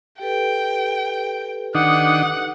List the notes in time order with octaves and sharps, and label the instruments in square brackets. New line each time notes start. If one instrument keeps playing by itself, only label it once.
[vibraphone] G4 A4 B4 [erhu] G5
[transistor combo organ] D#3 D4 D#4 [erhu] F#5